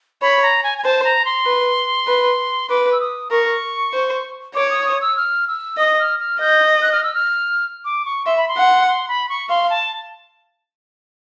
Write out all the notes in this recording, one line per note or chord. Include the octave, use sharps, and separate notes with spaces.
C#5 B5
A#5
G#5
G#5
C5 A5
A#5
C6
B4
B4
B4 D6
E6
D#6
A#4 C#6
C5
C#5 D6
D#6
D#6
E6
F6
E6
D#5 D#6
F6
F6
D#5 G6
F#6
F6
E6
F6
D6
C#6
E5 C6
B5
C6
F#5
C6
B5
C#6
F5 C6
A5